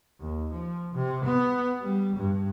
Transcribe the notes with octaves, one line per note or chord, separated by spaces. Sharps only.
D#2
F3
C3
B3
G3
G2